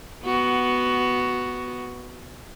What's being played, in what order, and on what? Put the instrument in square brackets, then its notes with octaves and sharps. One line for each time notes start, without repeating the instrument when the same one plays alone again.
[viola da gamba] B3 F#4